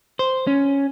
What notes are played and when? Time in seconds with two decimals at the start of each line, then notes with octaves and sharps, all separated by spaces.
0.19 C5
0.47 C#4